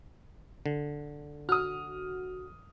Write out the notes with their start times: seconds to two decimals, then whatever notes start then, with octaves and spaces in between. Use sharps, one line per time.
0.66 D3
1.49 F#4 D#6 F6